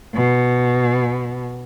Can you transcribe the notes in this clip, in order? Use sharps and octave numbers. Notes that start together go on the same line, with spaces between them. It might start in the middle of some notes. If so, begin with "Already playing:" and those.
B2